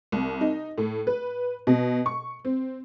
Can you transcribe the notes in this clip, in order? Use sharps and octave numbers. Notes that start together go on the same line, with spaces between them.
C2
D#4
A2
B4
B2
C#6
C4